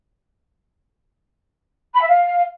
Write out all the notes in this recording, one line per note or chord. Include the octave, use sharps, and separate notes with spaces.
B5
E5
F5